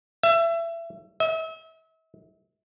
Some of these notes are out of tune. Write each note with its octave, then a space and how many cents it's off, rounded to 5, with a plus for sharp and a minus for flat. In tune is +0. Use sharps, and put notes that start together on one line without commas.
E5 +25
E5 -40